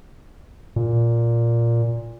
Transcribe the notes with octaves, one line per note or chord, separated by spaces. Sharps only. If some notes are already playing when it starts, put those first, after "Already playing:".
A#2